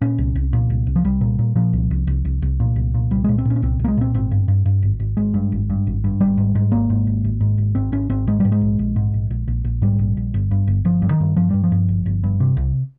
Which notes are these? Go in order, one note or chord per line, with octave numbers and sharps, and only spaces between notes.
A#2 C#4
C2
C2
A#2
C2
C2
F3
C2 G3
A#2
A#2
A#2 F3
C2
C2
C2
C2
C2
A#2
C2
A#2
C2 G3
A#2 G#3
C4
A#2 C#4
C#4
C2 C4
C2 A#3
G#3
A#2 C4
G#1 C4
G2
G2
G2
G#1
G#1
G#1 G#3
G2
G#1
G2
G#1
G2
G#1 G3
G#2
G#2
G#1 A#3
G#2
G#1
G#1
G#2
G#1
G#1 C4
G#1 C#4
G#1 C4
G#2 G#3
G#2 G3
G#3
A#1
A#1
G#2
A#1
A#1
A#1
A#1
G#2 G3
A#1
A#1
G1
G2
G1
G1 F3
G2
D#3
G2
G2 F3
G2 G3
F3
G2
G1
G1
G2
C3
C2